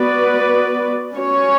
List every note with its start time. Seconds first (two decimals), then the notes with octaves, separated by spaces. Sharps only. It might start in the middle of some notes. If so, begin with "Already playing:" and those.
Already playing: B3 F#4 B4 D5
1.16 C#4 F#4 C#5